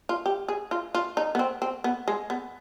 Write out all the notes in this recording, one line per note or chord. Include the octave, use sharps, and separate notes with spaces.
F4
G4
G#4
F4
F4
D#4
B3
C4
C4
B3
G#3
B3